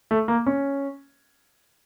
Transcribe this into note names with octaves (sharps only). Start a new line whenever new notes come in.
A3
A#3
C#4